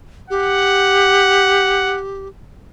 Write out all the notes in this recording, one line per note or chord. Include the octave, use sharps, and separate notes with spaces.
G4 F#5